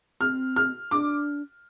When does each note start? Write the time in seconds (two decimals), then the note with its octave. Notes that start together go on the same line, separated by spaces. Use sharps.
0.21 C4 F6
0.56 F6
0.91 D4 D6